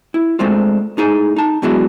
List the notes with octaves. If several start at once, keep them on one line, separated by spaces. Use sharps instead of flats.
E4
G#3 A3 C4 D4 F4
A2 D#4 G#4 G#5
D#4 A5
E2 B2 E3 F#3 G#3 D4